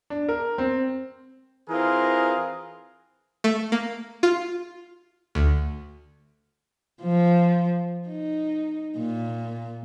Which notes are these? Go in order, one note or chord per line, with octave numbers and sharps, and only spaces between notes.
D4
A#4
C4
E3 C4 F4 G#4 A#4
A3
A#3
F4
D2
F3
D#4
A#2